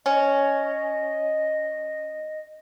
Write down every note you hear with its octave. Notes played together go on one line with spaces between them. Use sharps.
C#4 D#5